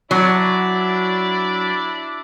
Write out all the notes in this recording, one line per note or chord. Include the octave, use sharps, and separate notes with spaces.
F#3 D4 E4 D5